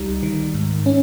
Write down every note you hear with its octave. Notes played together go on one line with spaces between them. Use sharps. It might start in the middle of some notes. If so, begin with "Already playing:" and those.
Already playing: C#2 G3 D#4
D#3
G#2
C#4